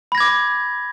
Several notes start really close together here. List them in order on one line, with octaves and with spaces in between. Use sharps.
B5 A#6 G#6 D6